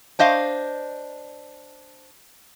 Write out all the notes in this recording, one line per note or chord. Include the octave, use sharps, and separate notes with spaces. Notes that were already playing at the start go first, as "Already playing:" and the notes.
D4 C5 D#5 F5